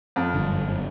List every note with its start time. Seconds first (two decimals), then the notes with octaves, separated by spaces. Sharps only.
0.16 F2
0.34 F#1 G2 D3